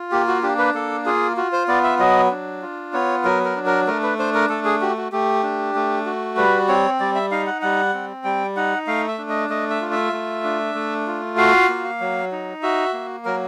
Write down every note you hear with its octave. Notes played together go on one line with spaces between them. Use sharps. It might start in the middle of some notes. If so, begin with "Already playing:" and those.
Already playing: F4
A#3 G4
F#4
D4 G4
B4
A#3 A4
F4 G#4
F4 F#4
C5
B3 D5
E5
F#3 D#5
D4
F4
B3 C#5
F#3 A#4
A#4
D4
A#4
A3 A#4
B4
D4 C5
A#4
A3 A4
G#4
F#4 G4
F#4
A3 G4
D4
A3
F#4
G3 B4
C4 C#5
G3 D5
E5
D#4 F5
F#5
G3 F#5
C4
G3 G5
D#4 F#5
A3 F5
E5
D4
D#5
A3 D#5
E5
F4
E5
A3
D4
A3
F4
F#4 F5
A#3
F#3
D#4
F#4 E5
A#3
F#3 A#4